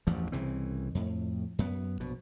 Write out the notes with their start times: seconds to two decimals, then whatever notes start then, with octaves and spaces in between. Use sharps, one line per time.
0.07 A1 E2 G2 F3
0.32 C2 C#3 E3 C4
0.95 F2 A2
1.59 F#2 B3
2.00 A#1 B2